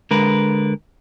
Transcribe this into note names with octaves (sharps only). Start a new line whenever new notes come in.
D3 G#3 A#4 B4